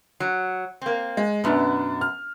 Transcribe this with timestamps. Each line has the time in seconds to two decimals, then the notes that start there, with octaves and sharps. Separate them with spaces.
0.20 F#3
0.82 A#3 C4
1.17 G#3
1.44 F#2 B2 B3 C#4 D4
2.01 F6